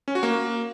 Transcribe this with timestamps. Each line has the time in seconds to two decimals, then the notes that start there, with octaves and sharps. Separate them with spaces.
0.08 C#4
0.15 F#4
0.23 A#3